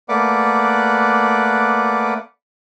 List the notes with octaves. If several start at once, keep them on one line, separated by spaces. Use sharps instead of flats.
A3 A#3 B4 D5 F#5 D6